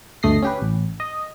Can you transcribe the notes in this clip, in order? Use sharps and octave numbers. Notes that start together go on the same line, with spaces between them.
G1 D2 A3 D#5 A#6 C7
C#4 G4 B4
A1
D#5